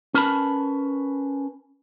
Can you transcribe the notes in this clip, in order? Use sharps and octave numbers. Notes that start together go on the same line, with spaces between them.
C#4 A#4 B4 A5 B5